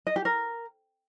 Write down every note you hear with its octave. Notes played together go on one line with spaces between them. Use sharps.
D#5
G4
A#4